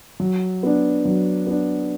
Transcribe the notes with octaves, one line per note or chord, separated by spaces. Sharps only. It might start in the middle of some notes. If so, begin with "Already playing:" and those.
F#3
B3 D4
F#3
B3 D4